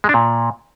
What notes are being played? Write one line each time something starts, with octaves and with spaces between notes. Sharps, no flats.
G#3
D4
A#2